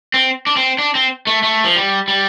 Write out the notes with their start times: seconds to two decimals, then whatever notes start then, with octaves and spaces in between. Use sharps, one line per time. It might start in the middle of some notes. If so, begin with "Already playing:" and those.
0.14 C4
0.47 D4
0.57 C4
0.79 D4
0.95 C4
1.27 A3
1.43 A3
1.64 F3
1.76 G3
2.08 G3